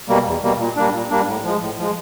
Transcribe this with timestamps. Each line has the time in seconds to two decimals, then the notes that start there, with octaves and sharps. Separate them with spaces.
0.08 B2 G3 A#3
0.25 E2
0.43 B2 G3 A#3
0.59 A#2
0.76 G3 A#3 D4
0.93 A#2
1.10 G3 A#3 D4
1.27 A2
1.44 F3 G#3
1.60 A2
1.77 F3 G#3